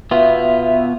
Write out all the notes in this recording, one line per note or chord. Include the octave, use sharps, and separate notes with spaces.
B2 B3 F4 E5